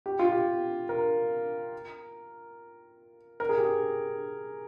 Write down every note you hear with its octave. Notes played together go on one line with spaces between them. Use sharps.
G4
F4
G4
A#4
A#4
G#4
G4
G#4